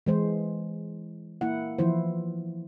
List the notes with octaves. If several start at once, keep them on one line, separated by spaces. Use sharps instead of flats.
E3 G#3 C5
A#3 E4 F#5
E3 F3 E4 C5